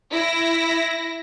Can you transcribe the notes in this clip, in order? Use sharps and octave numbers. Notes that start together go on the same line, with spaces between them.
E4 A#6